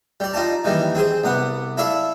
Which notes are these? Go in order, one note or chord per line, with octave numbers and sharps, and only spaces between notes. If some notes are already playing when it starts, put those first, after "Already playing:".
G3 D5
D#4 F4 D5 A5
D#3 E3 G3 A#3
C4 G#4 C5
C2 B3 F#5
E4 A4 D5 E5 F5